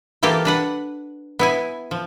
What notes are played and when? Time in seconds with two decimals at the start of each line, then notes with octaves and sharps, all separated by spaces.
0.23 E3 A#3 F4 G4 A4
0.45 D4 B4 F#5
1.39 B3 E4 G#5
1.91 F3